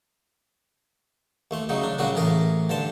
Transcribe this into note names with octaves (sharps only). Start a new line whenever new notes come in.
D#2 A3 C6
C#3 F#3 D#4
D4
A#2 C#3 F#3 G3 F#4
A1 A2 G#4 A#4
G2 D3 A5 C6